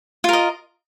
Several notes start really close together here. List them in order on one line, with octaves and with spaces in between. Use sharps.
F4 A#4 D#5